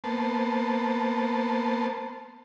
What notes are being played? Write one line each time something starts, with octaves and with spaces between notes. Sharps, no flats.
A#3 B3 C5 A5